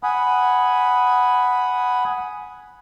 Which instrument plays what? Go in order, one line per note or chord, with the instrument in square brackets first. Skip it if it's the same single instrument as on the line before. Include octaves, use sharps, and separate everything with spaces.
[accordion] F#5 G#5 B5 D#6